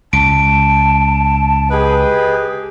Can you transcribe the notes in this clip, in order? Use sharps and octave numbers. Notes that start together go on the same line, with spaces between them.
C#2 A5 D7
G4 G#4 B4 D#5